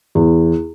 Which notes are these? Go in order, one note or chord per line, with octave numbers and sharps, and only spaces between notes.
E2